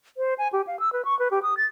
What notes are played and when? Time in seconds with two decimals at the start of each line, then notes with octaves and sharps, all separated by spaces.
0.17 C5
0.38 G#5
0.53 G4
0.67 F5
0.80 E6
0.93 B4
1.05 C#6
1.19 B4
1.31 G4
1.43 D#6
1.57 A6